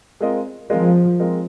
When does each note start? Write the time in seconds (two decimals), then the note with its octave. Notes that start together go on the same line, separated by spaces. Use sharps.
0.20 G#3 C4 F4 A#4 D#5
0.70 F3 G#3 C4 F4 A#4 D#5
1.20 G#3 C4 F4 A#4 D#5